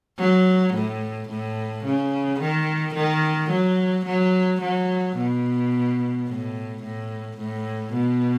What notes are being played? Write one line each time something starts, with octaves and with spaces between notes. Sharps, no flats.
F#3
A2
A2
C#3
D#3
D#3
F#3
F#3
F#3
B2
A2
A2
A2
B2